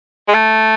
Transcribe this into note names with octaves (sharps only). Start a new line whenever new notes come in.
G#3
A3